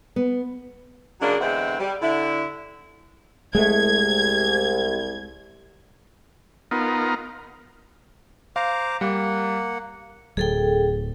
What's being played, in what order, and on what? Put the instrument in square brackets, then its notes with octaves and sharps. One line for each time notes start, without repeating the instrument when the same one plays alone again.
[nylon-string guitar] B3
[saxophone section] C#3 F#3 G#3 A#3 D4
E2 D3 G#3 C4 E5 F#5
G3
D3 E4
[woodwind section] C2 [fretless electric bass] G#3 A3 [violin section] G#6
[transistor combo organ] B3 D#4 F4 A#4
[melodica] C5 A#5 D6 [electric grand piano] F5
[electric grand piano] G3 [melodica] A#3 F#5
[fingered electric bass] D1 F#3 [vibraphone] G#4 A4 G5